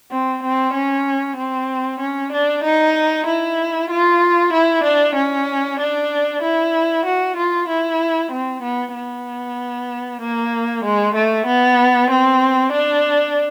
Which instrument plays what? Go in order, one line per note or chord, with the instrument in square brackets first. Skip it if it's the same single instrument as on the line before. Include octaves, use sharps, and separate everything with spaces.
[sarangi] C4
C4
C#4
C4
C#4
D4
D#4
E4
F4
E4
D4
C#4
D4
E4
F#4
F4
E4
C4
B3
B3
A#3
G#3
A3
B3
C4
D4